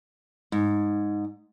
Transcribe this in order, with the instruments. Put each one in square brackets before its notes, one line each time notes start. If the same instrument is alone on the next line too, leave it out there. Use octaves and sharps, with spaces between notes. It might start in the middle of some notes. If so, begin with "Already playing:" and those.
[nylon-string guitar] G#2